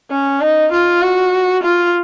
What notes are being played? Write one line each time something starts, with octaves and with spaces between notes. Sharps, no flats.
C#4
D#4
F4
F#4
F4